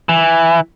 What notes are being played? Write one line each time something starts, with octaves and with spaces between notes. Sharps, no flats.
E3